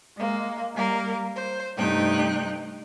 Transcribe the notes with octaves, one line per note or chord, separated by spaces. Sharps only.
G#3 A#3
G3 A#3 A#4
C5
G2 C3 A3 D#4 G5 F#6